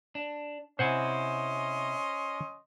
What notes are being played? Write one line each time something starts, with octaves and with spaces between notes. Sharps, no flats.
D4
C3 C#4 E4 C5 D#5 F#5 G#5 C6